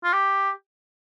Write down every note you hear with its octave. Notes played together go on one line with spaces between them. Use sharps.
F4
G4